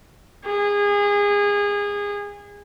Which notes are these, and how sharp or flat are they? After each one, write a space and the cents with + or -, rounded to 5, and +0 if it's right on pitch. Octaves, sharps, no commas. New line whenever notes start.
G#4 -25